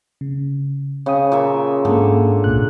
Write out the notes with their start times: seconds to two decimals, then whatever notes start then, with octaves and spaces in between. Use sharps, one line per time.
0.21 C#3
1.06 C#3 C#5 G5 D#6
1.32 A#2 E5
1.85 G#2 D3 G#3 A#3
2.44 C#2 A#2 F#6